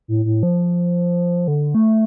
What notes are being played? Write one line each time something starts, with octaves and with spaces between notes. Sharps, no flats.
A2
A2
F3
D3
A3